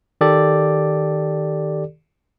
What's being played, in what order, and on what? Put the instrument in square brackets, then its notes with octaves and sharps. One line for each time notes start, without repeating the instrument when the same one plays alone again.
[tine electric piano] D#3 G4 A4 D5